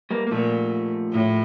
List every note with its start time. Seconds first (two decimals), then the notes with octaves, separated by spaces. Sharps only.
0.11 G3 A#3
0.27 A#3
0.31 A#2 F3 A3
1.12 A2